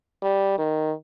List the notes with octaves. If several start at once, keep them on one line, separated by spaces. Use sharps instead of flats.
G3
D#3